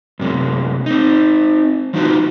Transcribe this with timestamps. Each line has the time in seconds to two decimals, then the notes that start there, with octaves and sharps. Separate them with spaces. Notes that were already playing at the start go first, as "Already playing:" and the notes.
0.19 F#2 C3 G#3
0.86 C4 D#4
1.94 F3 F#3 D#4 F4 F#4